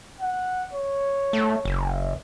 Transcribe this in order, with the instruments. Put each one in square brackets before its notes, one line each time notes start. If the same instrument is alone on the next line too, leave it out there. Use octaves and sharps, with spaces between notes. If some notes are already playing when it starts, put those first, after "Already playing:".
[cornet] F#5
C#5
[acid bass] A3
F#1